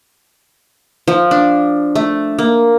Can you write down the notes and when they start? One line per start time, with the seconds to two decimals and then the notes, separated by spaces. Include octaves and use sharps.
1.08 F3
1.31 D4
1.95 A3
2.39 A#3